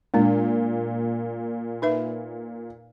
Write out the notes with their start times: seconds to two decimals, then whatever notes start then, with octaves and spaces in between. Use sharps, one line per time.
0.14 A#2 G#3 D4
1.82 D#4 B4 E5